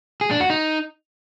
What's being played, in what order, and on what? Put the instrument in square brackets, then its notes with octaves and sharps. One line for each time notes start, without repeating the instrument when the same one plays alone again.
[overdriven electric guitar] G#4
D4
F#4
D#4